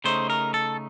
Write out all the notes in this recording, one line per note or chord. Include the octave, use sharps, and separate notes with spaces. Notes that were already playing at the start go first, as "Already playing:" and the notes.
C#3 A3 D#4 C5
A#4
A4